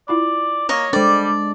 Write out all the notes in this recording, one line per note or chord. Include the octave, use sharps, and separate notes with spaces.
E4 F4 D5 B5
A#3 C#5 D#5
G3 G#3 D4 A4 C5 D5 G5